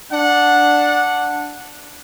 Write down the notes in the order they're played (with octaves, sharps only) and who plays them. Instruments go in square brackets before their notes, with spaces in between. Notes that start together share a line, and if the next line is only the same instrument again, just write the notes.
[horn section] D4 F#5